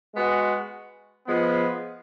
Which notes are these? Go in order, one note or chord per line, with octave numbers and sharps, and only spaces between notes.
G#3 B3 F#4
F3 G#3 B3